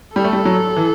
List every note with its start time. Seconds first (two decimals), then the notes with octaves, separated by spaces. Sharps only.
0.16 G3 A4
0.24 A3
0.33 G3
0.45 F#3
0.76 E3